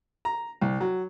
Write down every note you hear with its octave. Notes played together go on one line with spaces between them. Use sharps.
A#5
C2
F#3